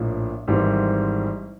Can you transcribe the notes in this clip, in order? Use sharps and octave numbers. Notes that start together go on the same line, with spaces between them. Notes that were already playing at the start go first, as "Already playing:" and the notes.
Already playing: A#1 A2 F3 A#3
G#1 G#2 E3 G3 C4